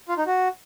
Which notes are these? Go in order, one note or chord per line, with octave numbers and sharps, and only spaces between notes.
F4
D#4
F#4